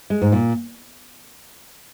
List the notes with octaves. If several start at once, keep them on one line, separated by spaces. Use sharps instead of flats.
G#3
G#2
A#2